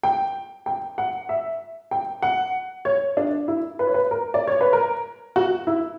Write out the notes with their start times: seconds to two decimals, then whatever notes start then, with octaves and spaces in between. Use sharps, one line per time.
0.03 G5
0.66 G5
0.98 F#5
1.29 E5
1.91 G5
2.22 F#5
2.85 C#5
3.17 D4
3.48 E4
3.79 B4
3.87 C#5
3.94 B4
4.11 A#4
4.34 D5
4.47 C#5
4.61 B4
4.73 A#4
5.36 F#4
5.67 E4